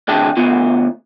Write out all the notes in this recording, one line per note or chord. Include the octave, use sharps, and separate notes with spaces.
D2 C3 D4 G#4 G5 A5
D2 B3 F4